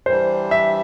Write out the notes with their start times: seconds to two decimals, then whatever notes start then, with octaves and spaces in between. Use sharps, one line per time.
0.06 E3 G3 D4 C5
0.51 E5